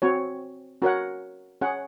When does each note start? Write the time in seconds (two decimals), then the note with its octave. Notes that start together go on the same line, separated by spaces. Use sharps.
0.02 C4 F#4 C#5
0.82 C#4 F#4 A#4 C#5 F#5
1.61 C#4 G#4 C#5 F#5